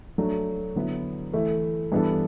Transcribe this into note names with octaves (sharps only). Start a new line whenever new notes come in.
F#3 A3 D4
D3 F#3 B3 E4
E3 A3 E4
G2 E3 B3 D4 A4